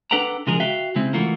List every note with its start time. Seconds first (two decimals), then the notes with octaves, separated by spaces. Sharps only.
0.11 D4 A4 B4 F#5 G5 A#5
0.47 C#3 F3 G#3 G#4 A#4
0.60 F#4 E5 F5 G5
0.96 C#3 G#3 C4 E4
1.13 E3 A3 F4 F#4 A#4